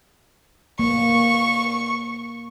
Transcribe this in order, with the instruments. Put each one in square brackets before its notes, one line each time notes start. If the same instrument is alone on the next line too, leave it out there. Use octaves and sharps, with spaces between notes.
[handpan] A#3 [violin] C#6